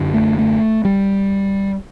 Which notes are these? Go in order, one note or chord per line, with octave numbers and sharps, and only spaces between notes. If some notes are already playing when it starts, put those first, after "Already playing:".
Already playing: F#2 D3
A3
A3
G3